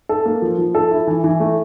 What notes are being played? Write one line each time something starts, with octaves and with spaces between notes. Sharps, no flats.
A4
A#3
F3
F3
A4
E4
E3
E3
A3